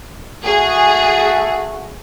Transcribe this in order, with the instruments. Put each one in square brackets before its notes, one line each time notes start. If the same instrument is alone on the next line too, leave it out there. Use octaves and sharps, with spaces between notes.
[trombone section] A3 F#4 [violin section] G#4